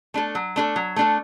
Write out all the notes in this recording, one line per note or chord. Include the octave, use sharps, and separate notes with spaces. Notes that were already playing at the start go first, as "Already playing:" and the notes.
A3 D4 A4
F#3
A3 D4 A4
F#3
A3 D4 A4